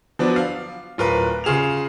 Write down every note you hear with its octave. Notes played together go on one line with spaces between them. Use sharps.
F3 F#3 B3 D4
F5
D1 F4 A#4 B4
C#3 F4 G#4 E7 F7